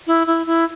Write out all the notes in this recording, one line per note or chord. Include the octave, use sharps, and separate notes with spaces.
E4
E4
E4